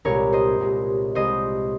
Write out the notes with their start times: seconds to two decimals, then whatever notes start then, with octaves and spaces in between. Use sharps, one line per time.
0.05 C2 A#2 G#3 A#4 C#5
0.33 C5 D#5
0.60 C2 A#2 G#3
1.15 C2 A#2 G#3 C5 D#5